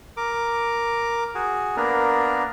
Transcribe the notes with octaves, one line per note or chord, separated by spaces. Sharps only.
A#4 D6
F#4 G#4
A#3 B3 D4 A#4